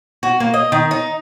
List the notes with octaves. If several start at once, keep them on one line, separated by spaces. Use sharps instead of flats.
F#4
A#3
D#5
D#3
D#4